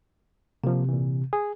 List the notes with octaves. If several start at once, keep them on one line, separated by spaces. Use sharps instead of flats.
C3 F3 A#3
A#2 E3
G#4